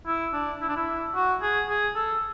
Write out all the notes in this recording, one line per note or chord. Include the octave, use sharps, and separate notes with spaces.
E4
D4
E4
D4
E4
F#4
G#4
G#4
A4